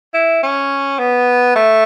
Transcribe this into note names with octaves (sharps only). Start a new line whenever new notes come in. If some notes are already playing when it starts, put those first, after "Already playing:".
E4
C#4
B3
A3